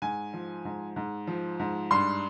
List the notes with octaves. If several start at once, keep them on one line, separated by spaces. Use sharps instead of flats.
G#2 G#5
F3
G#2
G#2
F3
G#2
G2 C6